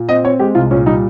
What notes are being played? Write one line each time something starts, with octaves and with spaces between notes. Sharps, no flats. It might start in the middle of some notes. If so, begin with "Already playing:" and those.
Already playing: A#2
C4 D#5
C4 C#5
G#3 G4
C2 F4
A#2 C#4
G3 D#4